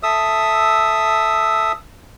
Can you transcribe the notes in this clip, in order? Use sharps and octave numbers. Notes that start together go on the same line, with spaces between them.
A4 E5 D#6 E6